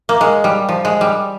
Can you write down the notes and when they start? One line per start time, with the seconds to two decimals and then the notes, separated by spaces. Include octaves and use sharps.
0.09 A#3
0.21 G#3
0.44 G3
0.69 F3
0.85 G#3
1.01 G3